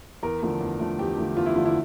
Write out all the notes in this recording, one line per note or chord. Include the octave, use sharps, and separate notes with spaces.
E2 A#4
D3 F3 A3
E2
D3 F3 A3
E2 G4
D3 F3 A3
E2 F4
E4
D3 F3 A3 F4
E4